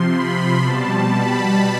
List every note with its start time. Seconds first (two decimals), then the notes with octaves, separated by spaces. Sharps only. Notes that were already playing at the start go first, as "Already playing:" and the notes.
Already playing: C3 F3 C6
0.10 B5
0.62 B2 G3 A5
1.15 B5